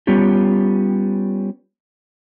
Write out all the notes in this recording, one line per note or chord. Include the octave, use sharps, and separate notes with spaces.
G3 B3 C#4 F4 G4